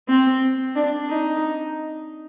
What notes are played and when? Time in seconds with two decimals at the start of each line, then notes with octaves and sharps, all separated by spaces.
0.09 C4
0.76 D4
1.09 D#4